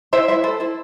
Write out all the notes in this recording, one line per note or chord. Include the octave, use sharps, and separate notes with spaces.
E4 C5 E5
E4 C5 E5
A4 C5
E4 C5